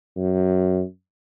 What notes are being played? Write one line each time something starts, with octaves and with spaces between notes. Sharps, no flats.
F#2